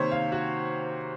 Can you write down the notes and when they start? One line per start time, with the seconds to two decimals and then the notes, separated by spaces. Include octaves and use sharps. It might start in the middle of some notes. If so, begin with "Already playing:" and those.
Already playing: C3 D#3 A#3 C5 C#5
0.12 F5
0.32 F#4